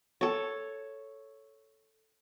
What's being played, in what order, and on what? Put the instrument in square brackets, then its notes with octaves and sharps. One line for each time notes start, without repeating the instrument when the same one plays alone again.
[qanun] A4 C#5